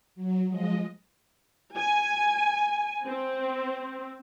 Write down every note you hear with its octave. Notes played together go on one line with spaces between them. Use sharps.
F#3
F3 G#3 D#5
G#5
C4